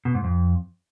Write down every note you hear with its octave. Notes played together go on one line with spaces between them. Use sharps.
B2
G#2
F2